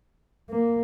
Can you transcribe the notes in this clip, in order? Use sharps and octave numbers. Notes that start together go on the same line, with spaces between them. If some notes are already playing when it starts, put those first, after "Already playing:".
A#3